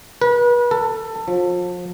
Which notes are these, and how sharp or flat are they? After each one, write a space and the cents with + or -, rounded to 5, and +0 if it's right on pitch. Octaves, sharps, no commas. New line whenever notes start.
B4 -35
A4 +20
F3 +35